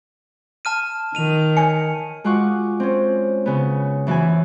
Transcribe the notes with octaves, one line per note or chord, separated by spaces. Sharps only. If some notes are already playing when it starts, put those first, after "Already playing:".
A5 F6 D#7
D#3 D#7 F7
C#5 D5 G#5 C#7
G#3 F4 F#4 F#5 C#6 D6
C4 C#4
C#3 B3
F#2 E3 B3 E4 G#5